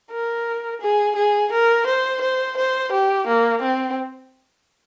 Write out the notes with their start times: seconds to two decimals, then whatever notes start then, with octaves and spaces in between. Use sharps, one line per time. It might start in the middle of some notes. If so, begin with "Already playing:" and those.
0.11 A#4
0.81 G#4
1.16 G#4
1.52 A#4
1.86 C5
2.21 C5
2.57 C5
2.92 G4
3.27 A#3
3.62 C4